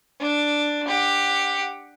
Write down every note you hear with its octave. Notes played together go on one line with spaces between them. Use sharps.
D4
G4 F#5